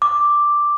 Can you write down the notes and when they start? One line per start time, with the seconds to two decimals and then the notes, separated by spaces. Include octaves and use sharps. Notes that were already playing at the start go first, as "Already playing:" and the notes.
0.02 D6